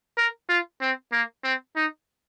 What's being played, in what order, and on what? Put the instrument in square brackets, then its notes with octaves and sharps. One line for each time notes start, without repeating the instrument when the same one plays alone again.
[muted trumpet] A#4
F4
C4
A#3
C4
D#4